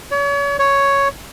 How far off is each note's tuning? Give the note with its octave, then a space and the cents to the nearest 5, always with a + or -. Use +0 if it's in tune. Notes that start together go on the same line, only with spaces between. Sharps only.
C#5 +40
C#5 +5